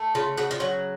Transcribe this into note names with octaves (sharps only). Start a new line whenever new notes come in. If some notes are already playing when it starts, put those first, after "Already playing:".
Already playing: A3
C#3 F4
C#3 F#4
F4
F#3 F#4